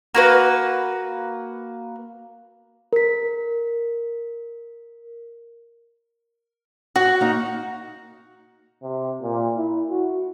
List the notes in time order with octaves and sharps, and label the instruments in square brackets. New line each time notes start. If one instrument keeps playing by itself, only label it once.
[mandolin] A#3 F#4 B4
[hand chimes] A#4 B6
[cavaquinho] F#4 [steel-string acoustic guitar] F#5
[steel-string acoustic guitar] A#3 D#4
[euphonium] C3
A#2
E4
F#4